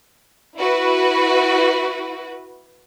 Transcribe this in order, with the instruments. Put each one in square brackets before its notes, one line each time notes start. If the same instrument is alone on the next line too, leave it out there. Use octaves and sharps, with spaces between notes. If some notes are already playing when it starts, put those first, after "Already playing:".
[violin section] E4 F#4 B4